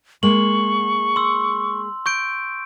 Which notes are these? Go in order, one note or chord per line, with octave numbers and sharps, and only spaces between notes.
G#3 A#3 C#6 F#7
C6 E6
C#6 G6 D7